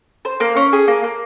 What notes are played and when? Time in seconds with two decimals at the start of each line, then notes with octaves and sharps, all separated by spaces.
0.25 C5
0.40 A#3
0.56 C#4
0.73 G#4
0.88 A#3
1.04 A#3